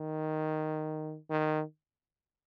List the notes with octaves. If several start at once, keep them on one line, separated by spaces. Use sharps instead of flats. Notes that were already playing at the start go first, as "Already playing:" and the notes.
Already playing: D#3
D#3